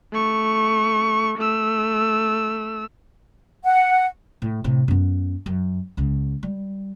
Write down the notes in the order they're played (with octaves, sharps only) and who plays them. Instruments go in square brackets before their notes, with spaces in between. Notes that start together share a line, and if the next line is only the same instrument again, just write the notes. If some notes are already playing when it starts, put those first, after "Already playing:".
[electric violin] A3 C#6
A3 E6
[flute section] F#5
[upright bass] A2
A2 C3
F#2 B3
F#2
C#2 C#3
G3